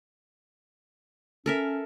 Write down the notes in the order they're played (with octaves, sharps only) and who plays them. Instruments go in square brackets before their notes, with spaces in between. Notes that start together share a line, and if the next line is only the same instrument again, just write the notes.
[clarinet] C#4 [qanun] A4 A#4 E5